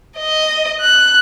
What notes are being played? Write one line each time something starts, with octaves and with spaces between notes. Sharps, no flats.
D#5
F#6